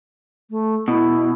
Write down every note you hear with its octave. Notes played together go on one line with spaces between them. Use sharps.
A3
B2 E4